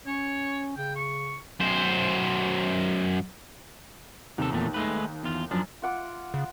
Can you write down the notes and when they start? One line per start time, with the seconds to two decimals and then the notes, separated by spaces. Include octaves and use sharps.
0.06 C#4 C#5
0.77 C#3 G5
0.96 C#6
1.60 F#2 C5
4.38 D#2 C3 A4
4.51 E2 A#2 A3
4.74 G#3 A3 B4
5.23 E2 F4
5.51 F#2 F3 D4
5.82 F4 F#5 D6
6.34 C#3